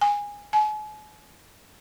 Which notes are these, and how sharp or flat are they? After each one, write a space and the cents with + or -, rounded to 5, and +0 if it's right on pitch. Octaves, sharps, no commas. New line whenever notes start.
G#5 -15
G#5 +40